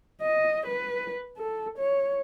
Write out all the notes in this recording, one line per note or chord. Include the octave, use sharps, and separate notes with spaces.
D#5
B4
A4
C#5